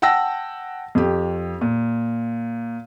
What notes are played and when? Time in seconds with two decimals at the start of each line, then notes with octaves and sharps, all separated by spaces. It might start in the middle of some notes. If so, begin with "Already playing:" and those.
0.02 F#5 G5 A5 E6 A#6
0.95 F2 G4
1.61 A#2